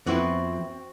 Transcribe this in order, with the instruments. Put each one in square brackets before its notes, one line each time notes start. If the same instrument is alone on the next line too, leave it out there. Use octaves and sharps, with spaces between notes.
[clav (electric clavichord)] F2 [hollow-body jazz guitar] B3 E4 B4 [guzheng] C4 F#4 D5